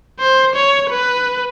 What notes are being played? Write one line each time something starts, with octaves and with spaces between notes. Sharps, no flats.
C5
C#5
B4